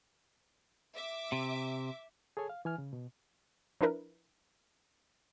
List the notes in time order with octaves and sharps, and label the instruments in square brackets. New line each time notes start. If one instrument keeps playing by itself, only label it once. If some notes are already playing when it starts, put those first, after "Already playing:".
[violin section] E5 D6
[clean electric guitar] C3
[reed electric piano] G#4 A4 C#5 G#5
F5
E3 G#5 F6
C#3
B2
[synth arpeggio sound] F3 D4 E4 A#4 B4